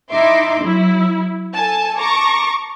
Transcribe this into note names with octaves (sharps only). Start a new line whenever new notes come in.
D#4 E4 E5 C6 D6
F#3 E4
A4 G#5 A5
A5 A#5 C#6 D6 A#6